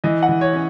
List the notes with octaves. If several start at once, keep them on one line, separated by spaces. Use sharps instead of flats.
E3 D#5
F#5
E3
C#5
C#4